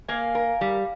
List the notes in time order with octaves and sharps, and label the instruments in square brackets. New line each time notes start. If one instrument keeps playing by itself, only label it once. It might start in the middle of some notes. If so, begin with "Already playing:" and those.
[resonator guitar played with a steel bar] A#3 [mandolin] F5 G#5
[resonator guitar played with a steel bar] A#4
G3